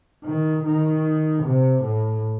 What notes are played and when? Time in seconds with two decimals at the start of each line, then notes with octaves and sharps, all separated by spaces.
0.24 D#3
0.64 D#3
1.43 C3
1.83 A2